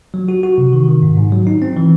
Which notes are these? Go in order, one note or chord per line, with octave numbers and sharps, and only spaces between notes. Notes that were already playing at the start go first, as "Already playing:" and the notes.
F#3
F#4
F#4
C3
D#3
D#3
G#2
G#2
F#3
D#4
C4
E3